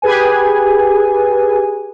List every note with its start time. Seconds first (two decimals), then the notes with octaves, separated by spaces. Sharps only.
0.02 G4 G#4 B4 G#5